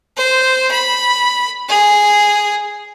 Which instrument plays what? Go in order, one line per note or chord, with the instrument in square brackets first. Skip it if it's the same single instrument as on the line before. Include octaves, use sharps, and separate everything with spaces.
[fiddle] C5
B5
G#4